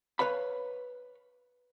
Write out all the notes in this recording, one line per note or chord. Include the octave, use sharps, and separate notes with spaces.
B4 C#5 F5 B5